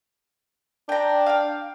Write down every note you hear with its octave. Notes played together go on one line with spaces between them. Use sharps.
D4 G5 A#5
F5 G5